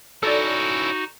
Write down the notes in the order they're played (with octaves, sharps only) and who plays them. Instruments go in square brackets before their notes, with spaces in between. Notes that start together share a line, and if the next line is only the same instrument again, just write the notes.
[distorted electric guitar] C#4 E4 [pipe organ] D#4 F#4 [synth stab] A4 D5